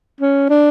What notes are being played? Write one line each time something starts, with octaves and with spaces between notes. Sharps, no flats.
C#4
D4